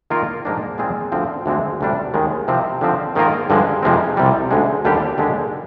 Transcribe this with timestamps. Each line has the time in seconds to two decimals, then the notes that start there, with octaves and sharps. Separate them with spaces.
0.10 D#3 A#3 F4 A#4
0.45 G#2 F3 A#3 D4
0.78 A#2 G#3 C4 F4 G#4
1.12 D2 D3 F3 C4
1.46 D2 D3 G#3 C4
1.81 D2 C3 G3 D4
2.14 D#2 D#3 G#3
2.48 C3 F3 C4
2.81 D3 F3 C4
3.15 G#2 D#3 A#3 F4 A#4
3.50 G2 D3 F3 G#3
3.83 F2 C3 F3 G#3 C4
4.17 C2 C3 G3
4.51 D2 D3 G#3
4.85 D#2 D3 G3 D4 G4
5.18 D#2 D3 G#3